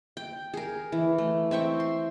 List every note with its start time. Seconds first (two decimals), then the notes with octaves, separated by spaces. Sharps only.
0.17 G5
0.54 G#4 A#4
0.92 E3
1.18 A3
1.51 C4 E5 G5 C#6
1.80 C6